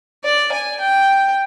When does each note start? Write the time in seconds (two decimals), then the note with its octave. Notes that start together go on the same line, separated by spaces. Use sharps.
0.24 D5
0.52 G#5
0.80 G5